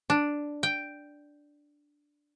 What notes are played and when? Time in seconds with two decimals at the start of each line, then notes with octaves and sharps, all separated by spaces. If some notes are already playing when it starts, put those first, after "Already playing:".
0.10 D4
0.63 G5